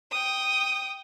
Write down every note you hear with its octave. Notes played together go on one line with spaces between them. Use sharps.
G5 D#6